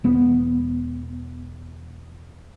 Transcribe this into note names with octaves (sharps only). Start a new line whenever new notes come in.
E1 B3